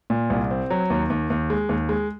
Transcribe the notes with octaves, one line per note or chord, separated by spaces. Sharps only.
A#2
C2
C4
F#3
D#2
D#2
D#2
G#3
D#2
G#3